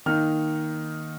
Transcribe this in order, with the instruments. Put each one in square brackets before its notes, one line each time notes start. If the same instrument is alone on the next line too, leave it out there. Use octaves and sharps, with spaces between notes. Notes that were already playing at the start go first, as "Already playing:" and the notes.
[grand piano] D#3 A#3 D#4 F6